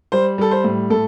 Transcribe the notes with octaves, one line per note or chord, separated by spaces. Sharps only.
G3 C5
G3 A4
C5
A2
A2 A4